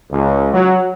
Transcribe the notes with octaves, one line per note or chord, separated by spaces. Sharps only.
C#2
F#3